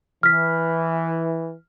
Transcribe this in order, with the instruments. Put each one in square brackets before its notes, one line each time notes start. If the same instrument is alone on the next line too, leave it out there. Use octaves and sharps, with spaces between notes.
[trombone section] E3 [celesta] F6 B6